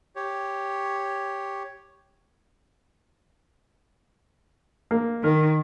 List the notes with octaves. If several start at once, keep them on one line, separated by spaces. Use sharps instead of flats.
G4 C#5
A#3
D#3 A#4